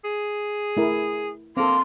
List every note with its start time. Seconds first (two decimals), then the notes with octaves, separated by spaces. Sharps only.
0.05 G#4
0.77 A3 E4 A#4
1.57 A#3 C4 A4 C6